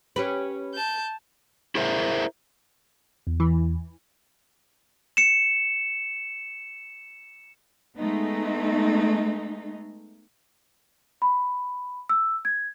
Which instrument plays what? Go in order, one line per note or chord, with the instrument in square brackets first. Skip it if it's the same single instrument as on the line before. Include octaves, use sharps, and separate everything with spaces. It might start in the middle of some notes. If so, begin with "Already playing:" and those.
[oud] C#4 G4 B4
[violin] A5 G6
[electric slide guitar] E4 G#4 A#4 C5 E5
[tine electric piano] E2
[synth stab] E3
[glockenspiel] C#7 E7
[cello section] G#3 A3 B3 D#4
[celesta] B5
E6
G#6